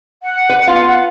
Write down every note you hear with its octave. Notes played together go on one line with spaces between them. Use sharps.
F#5
B4
B3 F4 F5
F#5